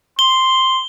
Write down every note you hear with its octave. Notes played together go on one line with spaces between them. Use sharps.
C6 G7